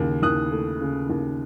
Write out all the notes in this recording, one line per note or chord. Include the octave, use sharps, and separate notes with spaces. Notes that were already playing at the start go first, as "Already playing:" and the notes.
Already playing: D#2 C#3
D#2 D#6 F#6
A3
C#3
D#2